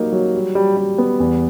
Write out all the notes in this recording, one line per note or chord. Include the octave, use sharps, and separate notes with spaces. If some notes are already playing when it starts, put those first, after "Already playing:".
Already playing: F#3 G3 A#3 D#4
F#3
G3
G3
G3
B3
E2